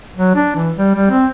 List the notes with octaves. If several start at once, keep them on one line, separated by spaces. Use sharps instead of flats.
F#3
D4
E3
G3
G3
C4